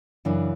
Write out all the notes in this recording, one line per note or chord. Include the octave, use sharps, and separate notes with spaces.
F#2 C#3 E3 D4